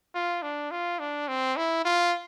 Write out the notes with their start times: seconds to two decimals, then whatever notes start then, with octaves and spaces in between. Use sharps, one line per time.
0.15 F4
0.42 D4
0.71 F4
0.99 D4
1.28 C4
1.57 E4
1.85 F4